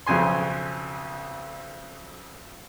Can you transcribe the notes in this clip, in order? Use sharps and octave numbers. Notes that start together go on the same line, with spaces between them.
B1 F2 C#3 G#5 C6